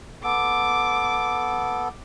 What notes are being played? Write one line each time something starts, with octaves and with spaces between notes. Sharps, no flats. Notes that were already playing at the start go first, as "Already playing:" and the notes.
B3 A4 D6